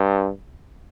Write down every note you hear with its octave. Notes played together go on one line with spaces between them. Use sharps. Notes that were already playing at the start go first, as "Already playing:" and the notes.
Already playing: G2